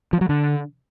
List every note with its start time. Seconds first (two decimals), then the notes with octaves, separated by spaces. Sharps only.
0.13 F3
0.21 F#3
0.29 D3